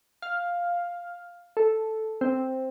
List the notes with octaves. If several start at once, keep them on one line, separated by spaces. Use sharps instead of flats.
F5
A4
C4